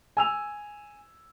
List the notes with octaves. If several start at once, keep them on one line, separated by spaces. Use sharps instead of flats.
G#5 E6 F7